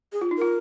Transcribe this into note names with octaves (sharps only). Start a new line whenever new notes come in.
G#4
F4
D#4
F4 A#4